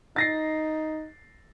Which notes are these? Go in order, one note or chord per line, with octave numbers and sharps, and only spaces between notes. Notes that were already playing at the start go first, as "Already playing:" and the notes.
D#4 A6 A#6 C7